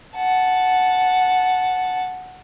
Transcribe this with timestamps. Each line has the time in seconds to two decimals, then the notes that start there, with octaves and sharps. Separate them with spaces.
0.16 F#5 A5